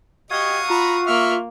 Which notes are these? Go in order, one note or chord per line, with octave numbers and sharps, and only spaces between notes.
F#4 G4 D#5 F5 F#5 C#6 D#6 G#6
F4 A#5 B5
A#3 E5 C#6 F6